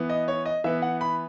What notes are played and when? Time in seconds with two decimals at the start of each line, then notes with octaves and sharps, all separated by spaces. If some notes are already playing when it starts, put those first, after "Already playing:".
Already playing: E3 B3
0.09 D#5
0.28 C#5
0.46 D#5
0.64 E3 B3 E5
0.82 F#5
1.01 B5